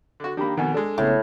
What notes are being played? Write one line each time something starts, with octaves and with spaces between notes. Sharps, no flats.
D3 F#4
D#3 A#3 D4 G4 B5
F2 B2 D#3 F#5 G#5
G#3 D4 A4
A#1 A2 C#3 B3